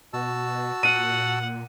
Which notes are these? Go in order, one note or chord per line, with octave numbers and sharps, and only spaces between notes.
B2 F#4 A5 E6
A#2 F#5 D#7